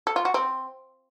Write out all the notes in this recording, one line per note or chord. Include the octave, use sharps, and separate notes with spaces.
A4
F4
F#4
C4